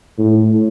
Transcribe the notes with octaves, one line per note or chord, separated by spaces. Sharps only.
A2